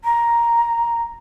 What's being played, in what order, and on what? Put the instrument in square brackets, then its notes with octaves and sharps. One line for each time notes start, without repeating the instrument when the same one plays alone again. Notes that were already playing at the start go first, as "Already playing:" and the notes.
[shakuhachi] A#5